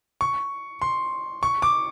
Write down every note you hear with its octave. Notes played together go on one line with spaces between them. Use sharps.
C#6
C6
C#6
D6